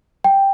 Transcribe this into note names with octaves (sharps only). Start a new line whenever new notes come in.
G5